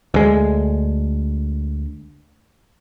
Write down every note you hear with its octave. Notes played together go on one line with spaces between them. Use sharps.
D2 G#3